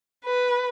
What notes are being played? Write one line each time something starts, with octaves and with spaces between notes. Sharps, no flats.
B4